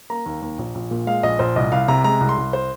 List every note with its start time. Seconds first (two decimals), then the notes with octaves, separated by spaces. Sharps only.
0.10 A#3 A#5
0.26 D#2
0.42 D#2
0.58 A#1
0.75 A#1
0.91 A#2
1.07 G#3 F5
1.23 A#1 D#5
1.39 A#1 C5
1.56 C2 D#5
1.72 C2 F5
1.88 C3 A#5
2.04 G#3 A#5
2.21 C2
2.29 C6
2.37 C2
2.53 C5